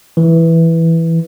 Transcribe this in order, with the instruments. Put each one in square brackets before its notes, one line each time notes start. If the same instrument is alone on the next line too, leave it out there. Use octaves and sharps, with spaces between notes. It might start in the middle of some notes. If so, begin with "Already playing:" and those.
[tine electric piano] E3